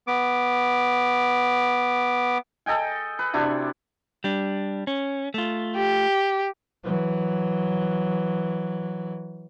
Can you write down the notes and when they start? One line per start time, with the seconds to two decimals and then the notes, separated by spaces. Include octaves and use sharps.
0.07 B3 D6
2.66 A4 D#5 G5 G#5
3.19 B4
3.34 C3 D4 E4 F#4
4.24 G3 D4
4.87 C#4
5.34 A3 F4
5.77 G4
6.84 E3 F#3